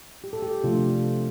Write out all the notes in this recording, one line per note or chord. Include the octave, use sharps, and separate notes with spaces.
G4
A4
G4
C3 F3 A3 F4
D4